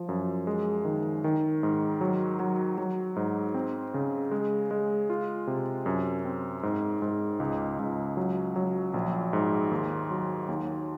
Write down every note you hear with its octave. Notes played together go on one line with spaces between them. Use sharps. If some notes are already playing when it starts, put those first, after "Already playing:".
Already playing: F3
F#2
G#3
D#3
D#3
G#2
F#3
F#3
F#3
G#2
C4
C#3
G#3
G#3
F4
C3
F#2
C4
G#2
G#2
C#2
C#2
F#3
F#3
A#1
G#2
D#2
F#3
D#2